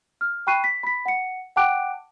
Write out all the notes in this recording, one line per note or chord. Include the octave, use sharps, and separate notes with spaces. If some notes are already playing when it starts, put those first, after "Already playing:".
F6
G5 B5 C#6 F#6 C7 D#7
B6
B5 B6
F#5 C#7
F#5 G5 A5 D6 F#6 D7